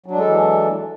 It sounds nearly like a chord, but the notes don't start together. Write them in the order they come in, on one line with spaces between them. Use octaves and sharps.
F#3 D4 G#3 A4 E3